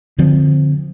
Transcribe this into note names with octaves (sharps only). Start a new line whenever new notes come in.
D3 F3 C4